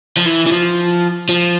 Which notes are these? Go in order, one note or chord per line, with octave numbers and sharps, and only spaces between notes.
F3
E3
E3
F3
F3